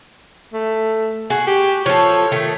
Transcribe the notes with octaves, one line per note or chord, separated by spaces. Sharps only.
A3
F#4 G#4
G4
F3 A4 C#5
D#3 A3 G5